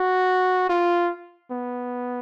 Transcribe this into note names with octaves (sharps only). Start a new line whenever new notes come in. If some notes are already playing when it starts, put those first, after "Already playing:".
Already playing: F#4
F4
B3